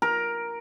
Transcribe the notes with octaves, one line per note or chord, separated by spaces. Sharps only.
A#4